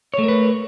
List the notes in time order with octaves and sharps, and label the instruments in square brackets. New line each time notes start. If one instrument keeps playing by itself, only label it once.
[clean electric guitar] C#5
A3
A#4
B4